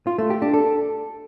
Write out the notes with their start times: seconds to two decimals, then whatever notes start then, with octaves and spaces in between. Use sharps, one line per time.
0.07 F4
0.18 A3
0.30 G4
0.42 D4
0.54 A4